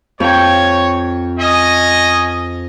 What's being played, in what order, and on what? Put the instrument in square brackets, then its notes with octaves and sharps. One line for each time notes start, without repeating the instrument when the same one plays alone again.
[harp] F2 G5 [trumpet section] C#5
[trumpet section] C#4 D#5